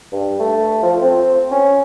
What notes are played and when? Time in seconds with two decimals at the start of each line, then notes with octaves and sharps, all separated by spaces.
0.12 G2
0.39 A3
0.82 F3
1.01 C4
1.51 C#4